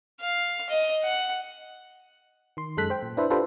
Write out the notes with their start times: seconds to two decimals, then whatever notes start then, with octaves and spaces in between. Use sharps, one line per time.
0.20 F5
0.69 D#5
1.04 F#5
2.57 D#3 C6
2.77 F#2 G#3 A4 F#6 B6
2.90 C5 G5
3.03 A#2
3.17 D4 E4 B4 C5 E5
3.30 D4 F4 G4 A4 B4 C5